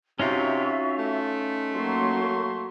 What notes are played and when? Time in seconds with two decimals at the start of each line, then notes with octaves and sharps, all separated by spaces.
0.20 C3 C#4 D#4 F4 F#4 E5 C#6
0.98 A3
1.74 F#3 A#3 C6 C#6